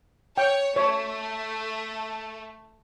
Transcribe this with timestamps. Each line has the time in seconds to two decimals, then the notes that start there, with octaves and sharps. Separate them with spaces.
0.38 C#5 G5
0.76 A3 C#5